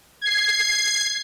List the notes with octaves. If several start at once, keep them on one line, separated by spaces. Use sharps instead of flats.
G#6 C7